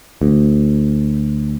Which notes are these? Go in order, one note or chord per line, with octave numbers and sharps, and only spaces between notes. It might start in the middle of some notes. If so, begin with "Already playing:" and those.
D2